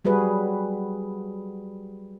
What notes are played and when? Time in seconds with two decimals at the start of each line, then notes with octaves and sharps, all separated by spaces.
0.05 F#3 G3 F#4 G#4 B4